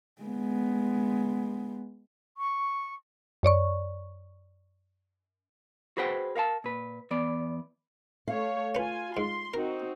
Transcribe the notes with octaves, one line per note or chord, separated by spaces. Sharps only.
G#3 B3
C#6
F#2 C#5 D5 C#6
F#4 G#4 B4 C5 F#5 G5
A#4 F5 F#5 A5
A#2 B4
E2 B3 D5
A3 C#5 F5
C#4 F4 B4 G#5
G#2 C6
C4 D#4 F#4 A#4